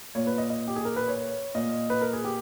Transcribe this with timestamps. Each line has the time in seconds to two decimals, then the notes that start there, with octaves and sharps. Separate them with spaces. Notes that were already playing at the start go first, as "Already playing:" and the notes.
0.15 A#2 C#5
0.27 B4
0.38 D#5
0.50 D#5
0.68 G4
0.76 G#4
0.85 A#4
0.96 B4
1.08 C#5
1.55 A#2 D#5
1.90 B4
2.02 A#4
2.13 G#4
2.25 G4